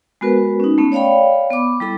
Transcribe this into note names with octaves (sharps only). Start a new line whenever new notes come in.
G#3 B3 F#4 A#4 B4
C#4 D#4
A3 B3 C#4
C#5 D5 F5 G5 B5
B3 B5 D6
G3 E4 A4 D6